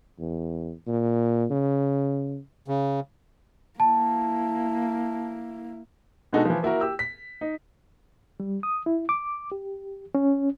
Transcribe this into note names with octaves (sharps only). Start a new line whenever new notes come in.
E2
A#2
C#3
C#3
A#3 E4 A5
B2 G#3 D4 D#4 F#4 A4
E3 F3
A#3 E4 F#4 A#4
G4 E6
B6
D#4
G3
D#6
E4
D6
G4
C#4